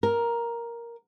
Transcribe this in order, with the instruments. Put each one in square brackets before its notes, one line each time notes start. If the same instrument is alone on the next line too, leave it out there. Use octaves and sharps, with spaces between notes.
[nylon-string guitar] A#4